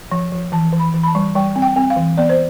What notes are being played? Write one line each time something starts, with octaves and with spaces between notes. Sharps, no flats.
F3
F3
E3 A5
E3
B5
E3
B5
A5
G3
G3 G5
C4
G5
C4
F5
E3
B3 D5
C5